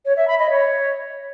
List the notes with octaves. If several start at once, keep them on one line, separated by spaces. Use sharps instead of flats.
C#5
E5
B5
D#5
C#5